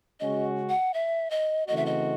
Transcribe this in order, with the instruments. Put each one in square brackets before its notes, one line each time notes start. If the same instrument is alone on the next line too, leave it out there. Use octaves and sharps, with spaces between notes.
[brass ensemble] C#3 G#3 C#4 F#4 [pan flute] D#5
[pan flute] F#5
E5
D#5
[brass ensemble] C#3 E3 A3 C4 F#4 [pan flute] D#5
[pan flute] E5
D#5